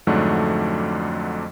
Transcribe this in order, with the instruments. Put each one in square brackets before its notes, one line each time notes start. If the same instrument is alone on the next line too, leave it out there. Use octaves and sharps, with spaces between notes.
[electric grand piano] F2 G#2 D3 F#3 A3 D4